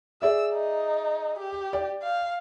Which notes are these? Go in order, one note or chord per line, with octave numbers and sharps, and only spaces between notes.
G#4 D5 E5 E6
D#4
G4
D5 G5
F5